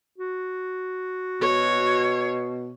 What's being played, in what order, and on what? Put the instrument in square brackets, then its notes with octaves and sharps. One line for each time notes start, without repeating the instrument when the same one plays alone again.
[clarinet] F#4
[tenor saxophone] B2 [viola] C#5